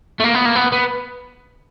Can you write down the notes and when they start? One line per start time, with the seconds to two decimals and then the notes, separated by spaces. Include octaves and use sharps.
0.20 A3
0.24 A#3
0.34 B3
0.45 A#3
0.55 B3
0.72 B3